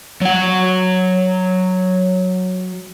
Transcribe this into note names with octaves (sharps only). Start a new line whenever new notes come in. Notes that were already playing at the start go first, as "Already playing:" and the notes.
F#3 F#5